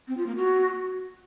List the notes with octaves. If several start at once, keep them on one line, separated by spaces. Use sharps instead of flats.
C4
F4
A#3
F#4